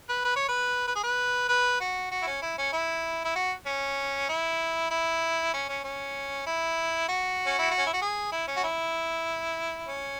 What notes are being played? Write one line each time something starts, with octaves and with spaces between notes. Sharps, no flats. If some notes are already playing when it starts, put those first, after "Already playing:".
B4
B4
C#5
B4
B4
G#4
B4
B4
F#4
F#4
E4
C#4
E4
C#4
E4
E4
F#4
C#4
E4
E4
C#4
C#4
C#4
E4
F#4
C#4
E4
F#4
C#4
E4
F#4
G#4
E4
C#4
F#4
E4
C#4